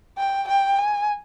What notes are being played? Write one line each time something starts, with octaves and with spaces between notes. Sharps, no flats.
G5
G5
G#5